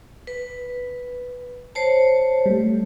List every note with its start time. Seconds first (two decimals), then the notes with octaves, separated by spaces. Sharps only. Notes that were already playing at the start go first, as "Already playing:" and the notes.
0.27 B4
1.75 C5 C#5 A5
2.46 G3 A3